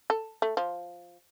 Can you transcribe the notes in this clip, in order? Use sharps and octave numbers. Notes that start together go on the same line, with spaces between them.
A4
A3
F3